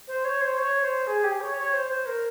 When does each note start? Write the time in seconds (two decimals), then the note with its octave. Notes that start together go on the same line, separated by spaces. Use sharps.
0.08 C5
0.25 C#5
0.41 C5
0.58 C#5
0.82 C5
1.07 G#4
1.24 G4
1.41 C#5
1.57 C#5
1.73 C5
1.90 C5
2.06 A#4